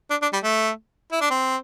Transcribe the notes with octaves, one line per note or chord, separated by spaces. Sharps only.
D4
D4
G3
A3
E4
D4
C4